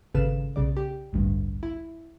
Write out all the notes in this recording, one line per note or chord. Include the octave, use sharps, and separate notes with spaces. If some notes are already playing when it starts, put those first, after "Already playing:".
G#1 C#3 A4 B4 F5 E7
B1 C#3 D5
G4
A1 D2 G2
E4